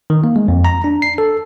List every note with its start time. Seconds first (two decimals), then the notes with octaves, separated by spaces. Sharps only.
0.10 D#3
0.24 A#3
0.36 G#3
0.48 F2
0.65 A#5
0.84 D4
1.02 C7
1.18 A4